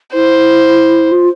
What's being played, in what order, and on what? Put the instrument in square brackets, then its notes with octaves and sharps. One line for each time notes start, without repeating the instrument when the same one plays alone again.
[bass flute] E4 [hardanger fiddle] C5
[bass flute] F4